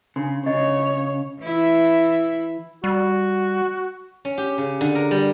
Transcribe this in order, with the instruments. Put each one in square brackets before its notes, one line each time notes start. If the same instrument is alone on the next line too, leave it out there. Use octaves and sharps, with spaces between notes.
[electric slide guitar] C#3 [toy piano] D4 C6
[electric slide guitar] C#3 [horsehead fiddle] C#5 [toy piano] D#5
[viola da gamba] E3 E4
[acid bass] G3 [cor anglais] F#4
[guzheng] C#4
G4
C#3
D3
A#4
G3